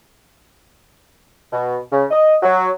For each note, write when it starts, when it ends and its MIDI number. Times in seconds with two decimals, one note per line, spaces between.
1.52 1.78 47
1.92 2.04 49
2.11 2.37 75
2.43 2.69 54